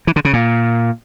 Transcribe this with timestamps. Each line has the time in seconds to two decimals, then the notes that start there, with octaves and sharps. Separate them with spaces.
0.07 E3
0.16 D3
0.25 C#3
0.33 A#2